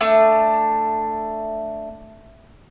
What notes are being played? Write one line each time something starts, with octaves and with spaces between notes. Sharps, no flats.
A3 D4